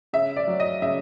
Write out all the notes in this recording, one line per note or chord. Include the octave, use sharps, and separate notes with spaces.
C#3 E5
D5
F#3
D#5
C#3 E5